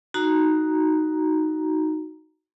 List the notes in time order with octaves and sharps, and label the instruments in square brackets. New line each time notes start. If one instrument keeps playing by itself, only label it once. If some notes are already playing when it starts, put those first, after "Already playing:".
[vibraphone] D#4 F#4 A#5